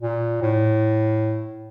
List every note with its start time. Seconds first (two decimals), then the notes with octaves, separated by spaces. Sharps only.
0.02 A#2
0.42 A2